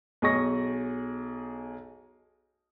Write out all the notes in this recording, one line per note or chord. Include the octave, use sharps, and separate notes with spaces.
B1 G#4 D#5 C#6 A#6